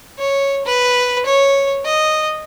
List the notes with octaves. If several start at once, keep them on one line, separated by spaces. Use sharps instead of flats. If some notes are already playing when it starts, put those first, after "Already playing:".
C#5
B4
C#5
D#5